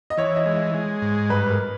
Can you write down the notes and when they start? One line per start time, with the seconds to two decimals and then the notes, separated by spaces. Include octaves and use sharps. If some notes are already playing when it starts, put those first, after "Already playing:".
0.10 D#5
0.17 E3 C#5
0.36 D#5
0.46 G#3
0.55 D#5
0.74 G#3
1.02 G#2
1.30 G2 B4
1.49 A#4